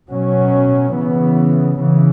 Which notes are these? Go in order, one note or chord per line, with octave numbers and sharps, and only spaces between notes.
B2 F#3 C#4
C#3 E3 B3
C#3 E3